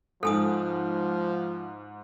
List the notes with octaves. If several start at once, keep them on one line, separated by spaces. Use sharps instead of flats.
G#2 F3 A4 G#5 D#6